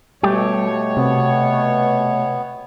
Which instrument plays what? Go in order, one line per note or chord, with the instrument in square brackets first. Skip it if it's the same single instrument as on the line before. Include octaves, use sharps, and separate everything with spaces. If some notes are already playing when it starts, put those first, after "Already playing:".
[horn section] B2 C#5 [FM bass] G3 [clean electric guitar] A3 G4
[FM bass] C3 [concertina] B3